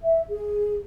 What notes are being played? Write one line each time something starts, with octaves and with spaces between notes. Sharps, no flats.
E5
G#4